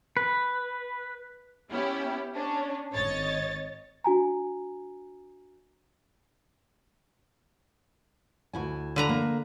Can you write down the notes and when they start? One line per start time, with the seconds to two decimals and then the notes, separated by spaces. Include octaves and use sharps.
0.17 B4
1.69 B3 C#4 E4 G4
2.34 C#4 D4
2.93 G#1 C#5 D#5 A6
4.04 D4 F#4 G#5 A#5
8.53 D2 E4 G#5
8.96 D3 B4 A#5
9.09 A#3